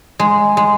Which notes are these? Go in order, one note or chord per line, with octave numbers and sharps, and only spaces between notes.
G#3
G#3